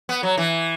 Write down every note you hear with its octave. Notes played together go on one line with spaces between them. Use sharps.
B3
F#3
E3